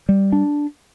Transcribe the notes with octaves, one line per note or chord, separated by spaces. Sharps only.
G3
D4